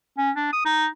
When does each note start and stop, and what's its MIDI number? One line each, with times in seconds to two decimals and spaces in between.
0.18 0.31 61
0.36 0.48 62
0.53 0.64 87
0.65 0.86 63